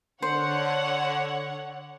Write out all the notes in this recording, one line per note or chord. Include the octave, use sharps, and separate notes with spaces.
D3 C5 C#5 F#5